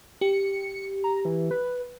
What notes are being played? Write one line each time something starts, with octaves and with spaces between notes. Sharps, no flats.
G4 C#7
A#5
E3
B4